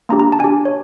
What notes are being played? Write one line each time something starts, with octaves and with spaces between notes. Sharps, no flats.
A#3 D4 G4 A#5
A#5
A5
D4 G#5
G4
C#5